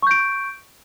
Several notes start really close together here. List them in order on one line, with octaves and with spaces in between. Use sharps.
C#6 G6 D7